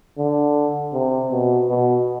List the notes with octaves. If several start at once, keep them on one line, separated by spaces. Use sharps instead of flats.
D3
C3
B2
B2